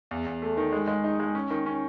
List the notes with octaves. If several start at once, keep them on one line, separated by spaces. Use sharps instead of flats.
E2
E2
A3
D#3
G#3
G#3
D#4
G#3
C#4
D#3
C#4